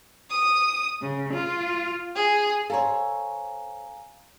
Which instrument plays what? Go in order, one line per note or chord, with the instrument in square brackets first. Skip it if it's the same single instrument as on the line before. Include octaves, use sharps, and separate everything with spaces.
[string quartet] D#6
C#3
F4
G#4
[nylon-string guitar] A4 C5 C#5 [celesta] F5 G#5 A#5